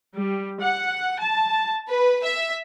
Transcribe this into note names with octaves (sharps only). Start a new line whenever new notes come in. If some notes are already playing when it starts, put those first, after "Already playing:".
G3
F#5
A5
B4
E5